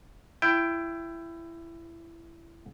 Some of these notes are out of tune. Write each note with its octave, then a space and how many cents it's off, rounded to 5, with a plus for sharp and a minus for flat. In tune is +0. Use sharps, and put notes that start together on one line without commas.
E4 +20 G5 +0